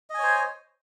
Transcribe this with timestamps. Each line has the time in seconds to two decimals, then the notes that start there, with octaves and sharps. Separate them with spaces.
0.10 D#5
0.14 G#5
0.19 C#5
0.23 C5